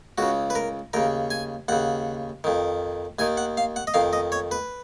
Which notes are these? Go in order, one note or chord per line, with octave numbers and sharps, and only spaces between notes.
C#2 C#3 F#4
B4
A#4
D#2 C#3 A#4
G#5
D#2 C#3 F#5
F2 D#3
D#2 D#3 G#5
F#5
F5
F#5
D#5
F2 D#3 F5
D#5
C#5
B4